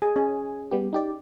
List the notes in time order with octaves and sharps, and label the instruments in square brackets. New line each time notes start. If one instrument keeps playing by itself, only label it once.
[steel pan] G#4 [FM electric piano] G#5
[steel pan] C#4 G#4
[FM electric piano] G3 B3 G4
D#4 G4 D5